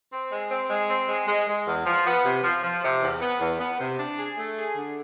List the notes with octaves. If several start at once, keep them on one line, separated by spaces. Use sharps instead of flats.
C4
G#3
C4
G#3
C4
G#3
G#3
G#3
E2
F3
B3
C3
F3
F3
C3
E2
B3
E2
B3
C3
D4
G#4
A3
G#4
D3